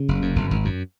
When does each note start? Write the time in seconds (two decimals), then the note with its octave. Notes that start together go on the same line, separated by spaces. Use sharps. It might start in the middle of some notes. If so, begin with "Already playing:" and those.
Already playing: C#3
0.08 F#1
0.22 F#2
0.36 F#1
0.51 G#1
0.65 F#2